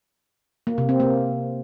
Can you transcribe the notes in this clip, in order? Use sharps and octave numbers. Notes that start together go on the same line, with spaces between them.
A#3
C3
C4
A#3